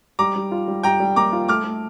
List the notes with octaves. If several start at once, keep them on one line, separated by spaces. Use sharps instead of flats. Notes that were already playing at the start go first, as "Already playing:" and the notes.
G3 A#5 D6
G3
F4
G3
G3 G5 A#5
G3
A#3 A#5 D6
F4
A3 D6 F6
A3